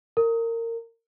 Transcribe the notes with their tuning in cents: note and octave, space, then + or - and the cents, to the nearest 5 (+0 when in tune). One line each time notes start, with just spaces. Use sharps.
A#4 -25